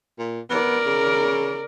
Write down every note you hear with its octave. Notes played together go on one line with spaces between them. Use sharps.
A#2
B3 A#4 D5
C#3